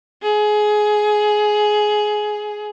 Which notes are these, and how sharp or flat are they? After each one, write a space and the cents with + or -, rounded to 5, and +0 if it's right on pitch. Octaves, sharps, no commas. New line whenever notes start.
G#4 +15